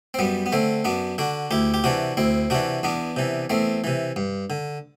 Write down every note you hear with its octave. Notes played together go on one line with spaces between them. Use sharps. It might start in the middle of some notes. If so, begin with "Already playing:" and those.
C4
F#2 G3 B3
B3
D3 A3 C4
F#2 B3 D4
D3 D4 F#4
D2 E4 G4
G4
C3 E3 D4 F#4
D2 C4 E4
C3 E3 D4 F#4
E2 B3 D4
C3 E3
E2 A3 C4
C3 E3
G2
D3